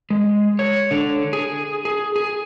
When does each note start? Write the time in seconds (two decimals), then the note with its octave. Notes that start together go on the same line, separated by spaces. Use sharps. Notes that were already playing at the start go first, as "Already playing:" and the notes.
0.10 G#3
0.59 C#5
0.91 D3
1.33 G#4
1.85 G#4
2.16 G#4